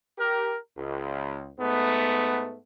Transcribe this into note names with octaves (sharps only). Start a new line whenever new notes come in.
G4 A#4
C#2
G#2 A3 B3